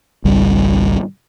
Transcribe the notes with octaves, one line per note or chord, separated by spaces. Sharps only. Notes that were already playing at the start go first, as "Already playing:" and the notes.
G#1 C#2 G3